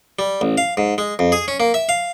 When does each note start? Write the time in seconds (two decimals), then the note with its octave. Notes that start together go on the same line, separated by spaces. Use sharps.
0.19 G3
0.41 A1
0.58 F5
0.77 G#2
0.98 G#3
1.19 F2
1.32 G#4
1.48 C#4
1.60 A#3
1.74 E5
1.89 F5